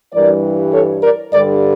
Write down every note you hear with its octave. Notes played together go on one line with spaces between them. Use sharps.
G2 E3 G3 A#4 D5
A4 C#5
A#4 D5
G2 D3 G3 A#4 D5